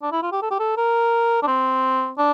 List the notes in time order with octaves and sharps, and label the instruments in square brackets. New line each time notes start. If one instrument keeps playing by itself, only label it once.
[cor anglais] D4
E4
F4
G4
A4
G4
A4
A#4
D4
C4
D4